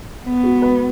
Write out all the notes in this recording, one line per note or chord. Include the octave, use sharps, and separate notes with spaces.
B3
F#4
B4